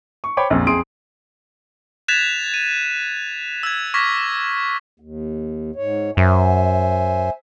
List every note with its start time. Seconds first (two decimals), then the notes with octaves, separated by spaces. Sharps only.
0.24 C#6
0.37 C5 C#5 G5 B5 C#6 D6
0.50 A#1 F2
0.67 F2 G#4 C6 D#6 D7
2.08 F#6 G#6 A6 B6 E7 F7
2.54 D#7
3.63 E6 G#6
3.94 C#6 D6 F6 G#6 A#6 B6
5.00 D#2
5.76 G#2 C#5
6.17 F#2 C5 E5 G#5